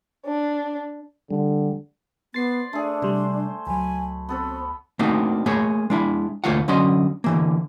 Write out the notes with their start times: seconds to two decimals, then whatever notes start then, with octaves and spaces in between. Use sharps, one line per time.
0.25 D4
1.31 D3 G3
2.34 B3 C5 D5 A6 C7
2.73 A3 D4 G#4
3.02 C3 G3 C5
3.67 C#2 F#3 G#5 B5
4.29 B3 C4 A4 C#5
4.99 A3 A#3 C4 D4 D#4 F#4
5.46 A3 A#3 G#4 C#5
5.90 G#3 D4 E4
6.44 D2 A3 A#3 F4 C#5 F#5
6.68 D3 F#3 C#4 D5 D#5 C6
7.24 D3 E3 A#3